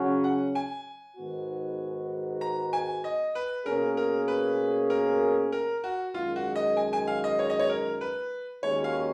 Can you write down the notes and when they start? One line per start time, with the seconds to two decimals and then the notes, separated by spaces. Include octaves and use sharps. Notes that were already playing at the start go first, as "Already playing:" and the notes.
Already playing: C#3 F#3 C#4 F#4
0.24 F#5
0.55 G#5
1.17 G#2 D#3 G#3 B3 F#4
2.41 A#5
2.73 G#5
3.04 D#5
3.35 B4
3.66 B2 A#3 C#4 G#4 A#4
3.97 A#4
4.28 B4
4.90 A#4
5.52 A#4
5.84 F#4
6.14 F#2 D#3 G#3 F4
6.36 F#4
6.56 D#5
6.77 G#5
6.93 G#5
7.07 F5
7.24 D#5
7.39 C#5
7.50 D#5
7.59 C#5
7.70 A#4
8.01 B4
8.63 D#2 D#3 G#3 C#4 F#4 C#5
8.84 F5